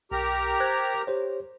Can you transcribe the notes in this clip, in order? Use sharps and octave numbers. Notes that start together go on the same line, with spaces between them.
B1 G4 A#4 A#5
C5 F#6 G#6
G4 C5 C#5